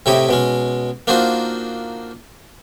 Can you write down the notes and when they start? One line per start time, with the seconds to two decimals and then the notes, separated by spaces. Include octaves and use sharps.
0.06 A2 C3 E4 G4 C#5 D#5
0.29 B2 G#3 C#4
1.07 A#3 D4 D#4 F4 F#4 C5